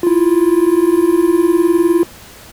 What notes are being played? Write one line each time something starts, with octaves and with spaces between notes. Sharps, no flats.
E4 F4